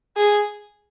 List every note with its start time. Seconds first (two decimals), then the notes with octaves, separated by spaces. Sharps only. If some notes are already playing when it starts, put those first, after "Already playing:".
0.17 G#4